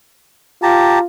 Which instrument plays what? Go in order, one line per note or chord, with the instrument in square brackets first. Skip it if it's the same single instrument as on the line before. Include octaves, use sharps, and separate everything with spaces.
[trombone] F4 [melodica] G4 A5 A#5